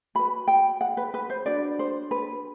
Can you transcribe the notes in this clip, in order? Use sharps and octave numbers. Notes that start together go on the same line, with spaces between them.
F#4 B4 B5
G5
F#5
B4
B4
C5
D4 F#4 B4 D5
C5
B4